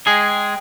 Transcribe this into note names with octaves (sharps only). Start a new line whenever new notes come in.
G#3 G#4 G5